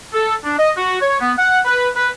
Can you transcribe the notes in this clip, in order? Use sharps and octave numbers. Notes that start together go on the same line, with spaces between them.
A4
D4
D#5
F#4
C#5
B3
F#5
B4
B4